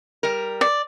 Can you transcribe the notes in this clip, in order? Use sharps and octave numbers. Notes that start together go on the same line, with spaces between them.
G3 A#4
D5